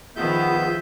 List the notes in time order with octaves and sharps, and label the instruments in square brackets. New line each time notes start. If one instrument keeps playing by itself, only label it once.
[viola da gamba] D#3 F3 [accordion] B3 [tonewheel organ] F4 G#4 [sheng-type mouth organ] E5 G6